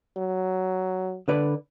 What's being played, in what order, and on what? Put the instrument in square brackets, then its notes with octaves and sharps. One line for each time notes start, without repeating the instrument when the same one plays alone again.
[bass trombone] F#3
[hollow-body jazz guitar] D3 B4 D5